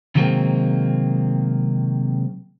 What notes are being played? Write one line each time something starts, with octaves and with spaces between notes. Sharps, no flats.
C3 D#3 F#3 G#3 A#3 C4